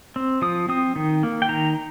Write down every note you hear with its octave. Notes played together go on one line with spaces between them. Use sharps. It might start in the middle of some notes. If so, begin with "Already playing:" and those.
C4
F3 D#6
C4 D#6
D#3
A#3
G5
D#3 A#5